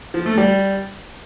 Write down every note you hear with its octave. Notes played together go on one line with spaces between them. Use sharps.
F3
A3
G3